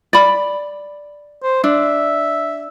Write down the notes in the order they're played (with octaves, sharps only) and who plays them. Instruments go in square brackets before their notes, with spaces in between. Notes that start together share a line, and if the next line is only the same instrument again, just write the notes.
[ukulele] D5 B5
[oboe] C5
[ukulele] D4 [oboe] E5